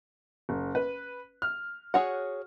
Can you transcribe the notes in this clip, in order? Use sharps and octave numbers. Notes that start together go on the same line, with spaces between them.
F#1
B4
F6
F#4 G#4 C#5 F#5